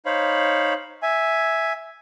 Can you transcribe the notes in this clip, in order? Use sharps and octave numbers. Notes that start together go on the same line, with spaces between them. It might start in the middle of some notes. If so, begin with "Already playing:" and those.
D#4 C5 C#5 F5 B5
E5 G#5